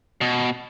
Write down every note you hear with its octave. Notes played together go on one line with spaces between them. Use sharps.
B2